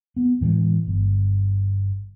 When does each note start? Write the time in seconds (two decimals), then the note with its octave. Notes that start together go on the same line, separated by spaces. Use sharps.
0.16 B3
0.41 A2 E3 G3 G#3
0.87 G1